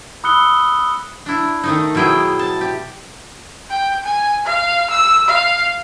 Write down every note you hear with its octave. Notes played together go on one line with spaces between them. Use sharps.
B5 D#6 E6 F#6 C#7 G7
D4 E4
D#3 A3 D#4
B2 F#3 E4 G#4 G5
A5
G4
G5
G#5
F5
E6
F5